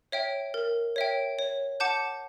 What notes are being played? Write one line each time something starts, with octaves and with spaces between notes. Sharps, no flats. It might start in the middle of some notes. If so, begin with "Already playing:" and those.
C#5 E5 G5
A#4
C#5 E5 G5
C#5
F#5 A5 D6 G6